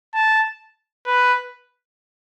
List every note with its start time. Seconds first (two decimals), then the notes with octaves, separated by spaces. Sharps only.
0.14 A5
1.06 B4